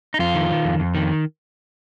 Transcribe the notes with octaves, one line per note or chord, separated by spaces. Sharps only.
D#4
F2 F4
D#3
D#3
F2
F2
D#3